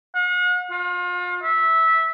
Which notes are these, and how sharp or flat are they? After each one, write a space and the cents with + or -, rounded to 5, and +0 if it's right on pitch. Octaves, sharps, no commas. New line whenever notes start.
F#5 -45
F4 +35
E5 -15